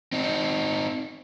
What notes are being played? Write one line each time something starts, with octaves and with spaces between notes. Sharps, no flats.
C4 D#4